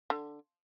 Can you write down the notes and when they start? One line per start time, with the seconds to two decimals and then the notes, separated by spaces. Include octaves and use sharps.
0.10 D3